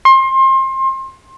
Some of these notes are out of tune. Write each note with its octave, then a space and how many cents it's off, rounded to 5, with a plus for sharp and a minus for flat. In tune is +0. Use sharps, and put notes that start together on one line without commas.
C6 +30